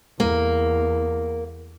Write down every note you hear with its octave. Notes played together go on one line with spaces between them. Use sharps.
E2 A#3